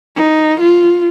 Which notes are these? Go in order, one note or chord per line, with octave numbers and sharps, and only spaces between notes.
D#4
F4